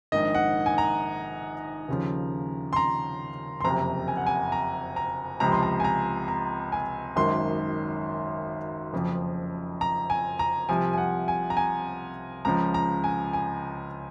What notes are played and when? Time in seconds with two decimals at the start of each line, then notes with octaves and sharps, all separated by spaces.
0.12 A#1 G#2 D#3 D#5
0.35 F#5
0.66 G#5
0.78 A#5
1.88 D#2 C#3 F3
2.73 C6
2.76 A#5
3.60 C6
3.64 F#1 F2 C3 A#5
4.08 G#5
4.17 F#5
4.27 G#5
4.52 A#5
4.96 A#5
5.40 C#2 C3 F3 A#5
5.52 C6
5.63 A#5
5.80 G#5
5.84 A#5
6.28 A#5
6.72 G#5
7.16 G#1 F#2 D#3 C6
8.93 F#1 F2 C#3 F3
9.81 A#5
10.10 G#5
10.39 A#5
10.69 C2 C3 F3 G#5
10.93 G#5
10.98 F#5
11.28 G#5
11.50 A#5
11.57 G#5
12.45 C#2 C#3 F3 A#5
12.74 A#5
13.04 G#5
13.33 G#5